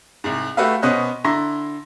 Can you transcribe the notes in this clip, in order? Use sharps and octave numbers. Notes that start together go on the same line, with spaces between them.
C2 G#2
A3 F#4 G4 B4 E5 F5
B2 B3 C#4 C5 D#5 F#6
D3 E4 A#5 C6 A#6